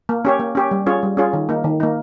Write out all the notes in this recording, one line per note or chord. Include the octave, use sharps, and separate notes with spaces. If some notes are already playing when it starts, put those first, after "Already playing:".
A#3
C#4 G4 C#5
A#3
C#4 G4 C#5
G3
C#4 F4 G#4 C#5
G3
C#4 F4 G#4 C#5
D#3
A#3 D#4
D#3
A#3 D#4